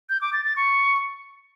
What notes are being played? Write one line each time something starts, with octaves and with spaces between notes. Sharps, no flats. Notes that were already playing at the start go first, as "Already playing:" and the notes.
G6
D6
A6
A6
C#6